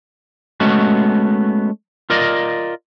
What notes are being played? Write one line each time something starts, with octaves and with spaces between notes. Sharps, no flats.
G#3 A3 B3 C#4 F#4
F4 A#4 D5 D#5